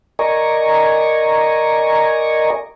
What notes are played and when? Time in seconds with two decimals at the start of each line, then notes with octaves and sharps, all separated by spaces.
0.19 A#4 D5 D#5 G#5 A#5 C#6